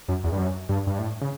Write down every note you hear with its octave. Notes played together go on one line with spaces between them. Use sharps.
F#2
E2
G2
F#2
G2
G2
A2
C#3